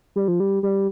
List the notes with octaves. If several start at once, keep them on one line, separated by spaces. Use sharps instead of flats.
G3
F3
G3
G3